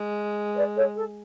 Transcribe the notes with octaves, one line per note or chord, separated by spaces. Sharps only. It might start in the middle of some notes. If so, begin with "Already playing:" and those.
Already playing: G#3
B4 D5
A4 C#5
A4